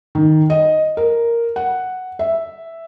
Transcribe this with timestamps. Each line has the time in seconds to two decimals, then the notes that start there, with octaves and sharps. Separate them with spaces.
0.15 D#3
0.50 D#5
0.97 A#4
1.56 F#5
2.19 E5